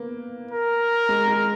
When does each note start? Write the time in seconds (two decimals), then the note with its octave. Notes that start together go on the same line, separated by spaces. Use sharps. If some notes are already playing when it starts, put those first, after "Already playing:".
Already playing: A#3 B3
0.51 A#4
1.09 G#3
1.27 G#3